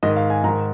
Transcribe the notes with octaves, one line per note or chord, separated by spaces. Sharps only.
G#2 D#3 D#5
F5
G#5
G#2 D#3 A#5